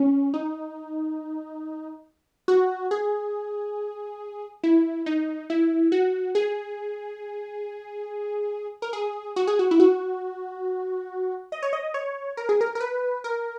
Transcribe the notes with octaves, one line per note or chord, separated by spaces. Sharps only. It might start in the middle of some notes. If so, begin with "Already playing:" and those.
Already playing: C#4
D#4
F#4
G#4
E4
D#4
E4
F#4
G#4
A#4
G#4
F#4
G#4
F#4
E4
F#4
D#5
C#5
D#5
C#5
A#4
G#4
A#4
A#4
B4
A#4